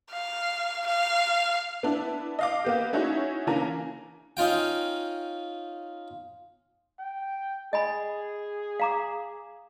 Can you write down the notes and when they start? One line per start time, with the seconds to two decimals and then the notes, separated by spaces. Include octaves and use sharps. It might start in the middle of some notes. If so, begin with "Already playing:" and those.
0.12 F5
0.87 F5
1.83 B3 D4 E4
2.39 D#5 F5 D6
2.64 A#3 B3 G4
2.93 C#4 D#4 E4 F#4 G#4 C#5
3.47 C#3 E3 A#3 D4 G#5 A#5
4.37 C#4 D#4 F4 G5
6.99 G5
7.73 G#4 D#5 G#5 B5
8.80 F5 A#5 D6